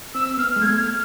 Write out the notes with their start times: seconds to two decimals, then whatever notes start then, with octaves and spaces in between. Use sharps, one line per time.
0.14 C4 E6
0.37 B3 F6
0.50 F6
0.56 G#3
0.61 A3 G#6
0.78 F6